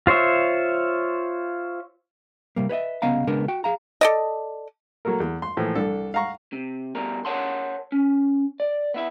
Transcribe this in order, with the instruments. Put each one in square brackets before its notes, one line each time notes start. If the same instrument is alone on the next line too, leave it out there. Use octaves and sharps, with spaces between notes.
[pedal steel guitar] F4 C5 C#5 E5
[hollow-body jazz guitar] C3 G3 A#3
B4 C#5 D#5 E5
C2 C#3 B3 D#5 F5 A#5
C#3 G#3 B3 D4 A#4
F#4 G5
G#4 F5 A#5
[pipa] A4 D5 D#5
[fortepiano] F#3 A#3 A4 A#4
E2
C6
A2 E3 F3 A#3
C2 D4 A4
F5 F#5 A#5 C#6
[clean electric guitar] C3
B2 G3 A#4
A#4 C5 C#5 F#5 A5 C6
C#4
D5
B3 E4 E5